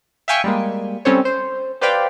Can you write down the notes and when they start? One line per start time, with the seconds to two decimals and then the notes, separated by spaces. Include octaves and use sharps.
0.28 E5 F5 G5 G#5 C#6
0.44 G3 G#3 A#3
1.05 G3 C4 C#4 A4 C5 C#5
1.25 C5
1.81 G4 B4 C5 D5 F5 G5